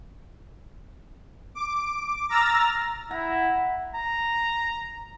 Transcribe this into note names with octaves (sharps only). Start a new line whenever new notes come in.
D6
A#5 E6 F6 A6 A#6
E4 F#5 A#5
A#5